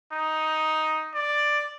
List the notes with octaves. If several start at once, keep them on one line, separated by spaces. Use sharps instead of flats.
D#4
D5